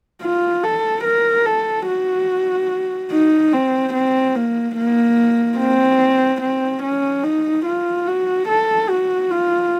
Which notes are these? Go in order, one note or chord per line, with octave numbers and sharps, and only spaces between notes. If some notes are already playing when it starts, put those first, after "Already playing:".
F4
A4
A#4
A4
F#4
D#4
C4
C4
A#3
A#3
C4
C4
C#4
D#4
F4
F#4
A4
F#4
F4